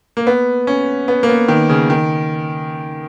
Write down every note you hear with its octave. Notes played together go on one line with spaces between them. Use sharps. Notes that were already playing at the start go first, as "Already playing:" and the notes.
A#3
B3
C#4
B3
A#3
B3
D#3
C#3
D#3